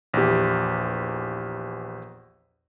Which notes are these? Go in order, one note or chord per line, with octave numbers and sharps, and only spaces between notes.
A#1 E2 G4